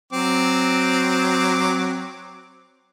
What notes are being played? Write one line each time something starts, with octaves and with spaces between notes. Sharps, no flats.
F#3 C4 D6